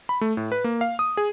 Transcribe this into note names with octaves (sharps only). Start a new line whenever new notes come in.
B5
A3
A2
B4
A#3
F5
D#6
G#4